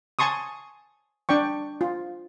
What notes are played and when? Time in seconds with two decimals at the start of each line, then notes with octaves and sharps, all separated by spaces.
0.19 G#5 A5 C6 C#6 D#6
1.29 D4 D5 G5 C#6
1.81 F4